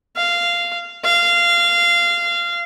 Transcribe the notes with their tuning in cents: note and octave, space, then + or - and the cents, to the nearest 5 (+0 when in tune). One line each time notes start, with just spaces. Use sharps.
F5 -10
F5 -20